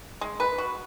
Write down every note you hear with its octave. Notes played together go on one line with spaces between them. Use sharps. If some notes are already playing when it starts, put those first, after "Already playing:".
G#3
B4
F#4